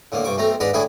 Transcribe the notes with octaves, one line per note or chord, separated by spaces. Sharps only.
A2 D3 A#3
G2 C3 C#6 D6
B1 A3 C4 A#5
G#2 D4 B4 F#5 A#5
D2 A2 D4 E4 G#4 F#5